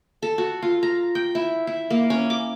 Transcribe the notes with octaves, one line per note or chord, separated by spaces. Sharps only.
A4
F#4
F4
A#5
G5
E4
E4
A#3
C#4
D6